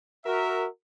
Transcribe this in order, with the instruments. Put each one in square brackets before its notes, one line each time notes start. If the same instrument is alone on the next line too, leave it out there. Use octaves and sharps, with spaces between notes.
[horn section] F#4 A#4 E5